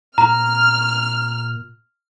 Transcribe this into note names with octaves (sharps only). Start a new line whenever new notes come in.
A#2 A#5 F6